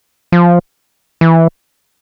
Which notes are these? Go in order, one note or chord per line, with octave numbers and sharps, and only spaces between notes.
F3
E3